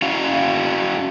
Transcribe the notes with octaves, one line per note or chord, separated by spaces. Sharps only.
C#4 E4 F#4 F5